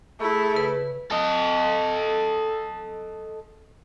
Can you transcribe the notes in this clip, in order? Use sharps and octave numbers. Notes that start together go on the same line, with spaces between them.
A3 E4 G#4
C#3 B4
A4 D#5